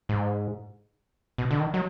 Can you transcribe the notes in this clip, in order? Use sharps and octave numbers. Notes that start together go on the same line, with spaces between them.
G#2
B2
D3
D#3
F#3